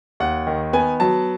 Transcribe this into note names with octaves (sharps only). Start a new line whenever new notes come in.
D#2 F#5
D#3
B3 G#5
F#3 A5